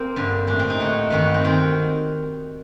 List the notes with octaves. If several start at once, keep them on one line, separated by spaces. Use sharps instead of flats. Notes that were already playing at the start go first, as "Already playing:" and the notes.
Already playing: A#3 C4
G2 D3
A2 D4
C4
D#4
A2 F#4
G2 D#3 F#4
C4
D#3 C4